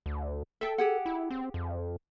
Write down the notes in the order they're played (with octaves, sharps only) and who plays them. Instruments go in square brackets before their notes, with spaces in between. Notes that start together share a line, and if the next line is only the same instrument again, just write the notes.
[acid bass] D2
[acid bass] A4 [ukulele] E5 G5
[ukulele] G4 G#4 F#5
[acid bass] E4
C4
F2